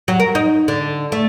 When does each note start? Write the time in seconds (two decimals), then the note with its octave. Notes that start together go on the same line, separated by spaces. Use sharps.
0.08 F#3
0.20 A#4
0.35 D#4
0.68 D3
1.12 A3